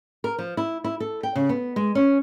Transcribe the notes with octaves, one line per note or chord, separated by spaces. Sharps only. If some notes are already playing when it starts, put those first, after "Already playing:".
A#4
F3
E4
E4
A4
G5
C#3
B3
G#3
C#4